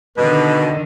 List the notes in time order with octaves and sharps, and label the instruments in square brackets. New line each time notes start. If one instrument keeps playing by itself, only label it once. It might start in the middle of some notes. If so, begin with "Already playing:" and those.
[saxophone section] B2 [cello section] D3 D#3 [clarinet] B4 [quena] D#5